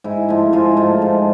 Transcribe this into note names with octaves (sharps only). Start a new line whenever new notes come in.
G#2 E4
F3 A3
G#2 F4
F3 A3
G#2